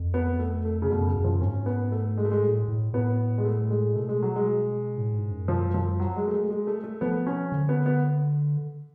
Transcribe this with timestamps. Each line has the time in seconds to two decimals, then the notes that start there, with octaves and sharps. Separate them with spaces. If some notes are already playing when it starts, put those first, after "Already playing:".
Already playing: F2
0.14 B3
0.39 A3
0.65 A3
0.82 C#3
0.90 F#2 B2
1.07 C#3
1.16 F#2
1.24 F3
1.41 G#2 C#4
1.66 B3
1.92 A3
2.18 G#3
2.25 A3
2.31 G#3
2.42 A2
2.68 A2
2.93 A2 B3
3.38 G#3
3.45 A3
3.70 G#3
3.96 B2 A3
4.09 G#3
4.22 F#3
4.36 G#3
4.97 A2
5.14 G#2
5.31 F#2
5.48 F3
5.74 F3
6.00 F#3
6.16 G#3
6.27 A3
6.34 G#3
6.50 G#3
6.67 A3
6.84 A3
7.01 F3 B3
7.27 C#4
7.52 D3
7.69 B3
7.86 B3